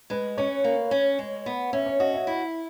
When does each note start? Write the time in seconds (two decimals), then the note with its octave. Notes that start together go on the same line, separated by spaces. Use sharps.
0.10 G#3 B4
0.38 C#4 C#5
0.64 A#3
0.91 C#4
1.19 G#3
1.46 B3
1.73 C#4 E5
1.86 C#5
2.00 F#4 D#5
2.13 E5
2.27 E4